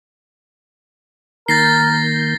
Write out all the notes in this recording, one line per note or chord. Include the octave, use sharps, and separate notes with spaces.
D#3 A#3 A#4 G6 A6 A#6 C7